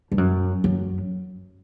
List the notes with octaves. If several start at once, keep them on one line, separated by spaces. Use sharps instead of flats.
G2
F#2
F#2